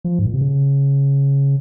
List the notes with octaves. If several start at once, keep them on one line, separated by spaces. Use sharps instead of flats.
F3
G#2
A#2
C3
C#3